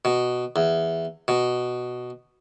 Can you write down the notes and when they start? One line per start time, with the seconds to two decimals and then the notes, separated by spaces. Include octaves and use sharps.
0.05 B2
0.56 E2
1.28 B2